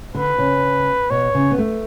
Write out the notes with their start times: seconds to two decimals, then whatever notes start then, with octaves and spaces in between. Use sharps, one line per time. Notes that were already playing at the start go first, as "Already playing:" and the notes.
0.14 D3 B4
0.38 C#3
1.10 B2 C#5
1.35 C#3
1.51 B3
1.58 A3